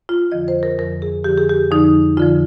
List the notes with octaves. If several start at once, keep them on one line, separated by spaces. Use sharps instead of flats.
F4
F2 D3 F3 D#5
C5
A#4
F2 D3 F3 A#4
G#4
F2 D3 F3 G4
G#4
G4
F2 D3 F3 D#4
F2 D3 F3 F4